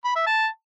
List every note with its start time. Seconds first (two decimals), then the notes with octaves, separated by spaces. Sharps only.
0.05 B5
0.16 E5
0.27 A5